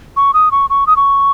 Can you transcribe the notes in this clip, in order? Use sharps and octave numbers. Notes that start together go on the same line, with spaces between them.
C#6
D#6
C#6
C#6
D#6
C#6